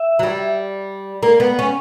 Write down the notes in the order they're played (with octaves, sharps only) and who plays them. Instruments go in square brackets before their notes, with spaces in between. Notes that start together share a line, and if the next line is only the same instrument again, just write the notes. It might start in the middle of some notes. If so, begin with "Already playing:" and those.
Already playing: [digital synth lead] E5
[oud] F#3
G3
A#3
B3
C#4